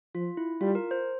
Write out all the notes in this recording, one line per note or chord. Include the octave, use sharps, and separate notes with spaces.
F3 F4
E4
G3 F4
A#4
C5